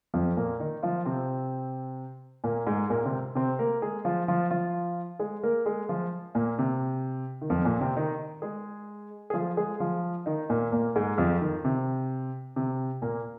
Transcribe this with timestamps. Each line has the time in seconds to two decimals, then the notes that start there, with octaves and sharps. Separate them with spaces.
0.14 F2 F3
0.37 A#2 A#3
0.60 D#3 D#4
0.83 F3 F4
1.05 C3 C4
2.44 A#2 A#3
2.67 G#2 G#3
2.90 A#2 A#3
3.05 C3 C4
3.35 C3 C4
3.59 A#3 A#4
3.82 G#3 G#4
4.05 F3 F4
4.28 F3 F4
4.51 F3 F4
5.19 G#3 G#4
5.43 A#3 A#4
5.66 G#3 G#4
5.89 F3 F4
6.35 A#2 A#3
6.59 C3
7.42 D#3
7.50 F2 F3
7.65 A#2 A#3
7.81 C3 C4
7.96 D#3 D#4
8.42 G#3 G#4
9.30 G#4
9.34 F3 F4
9.57 G#3 G#4
9.80 F3 F4
10.26 D#3 D#4
10.49 A#2 A#3
10.72 A#2 A#3
10.96 G#2 G#3
11.18 F2 F3
11.41 D#3
11.65 C3
12.56 C3
13.02 A#2 A#3